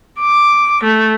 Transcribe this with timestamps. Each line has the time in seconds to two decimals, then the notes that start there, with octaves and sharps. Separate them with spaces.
0.20 D6
0.83 A3